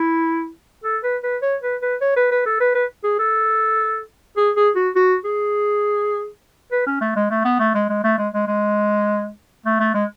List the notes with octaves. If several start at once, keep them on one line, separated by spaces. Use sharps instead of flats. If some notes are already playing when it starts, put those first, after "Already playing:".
Already playing: E4
A4
B4
B4
C#5
B4
B4
C#5
B4
B4
A4
B4
B4
G#4
A4
G#4
G#4
F#4
F#4
G#4
B4
C#4
A3
G#3
A3
B3
A3
G#3
G#3
A3
G#3
G#3
G#3
A3
A3
G#3